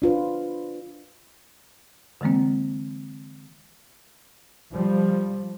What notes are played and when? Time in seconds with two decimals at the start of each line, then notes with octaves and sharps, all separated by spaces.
0.02 D4 F4 B4 C5
2.21 D3 E3 G#3 A#3 C4
4.72 F3 G3